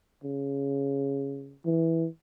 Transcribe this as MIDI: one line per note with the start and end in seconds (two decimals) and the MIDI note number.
0.24 1.56 49
1.65 2.06 52